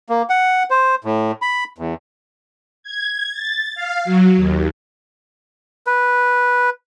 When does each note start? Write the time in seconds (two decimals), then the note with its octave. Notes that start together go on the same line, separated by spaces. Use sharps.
0.09 A#3
0.30 F#5
0.70 C5
1.04 A2
1.42 B5
1.78 E2
2.83 G#6
3.32 A6
3.75 F5
4.05 F#3
4.36 D#2
5.87 B4